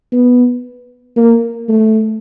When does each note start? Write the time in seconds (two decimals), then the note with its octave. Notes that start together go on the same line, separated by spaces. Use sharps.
0.12 B3
1.16 A#3
1.69 A3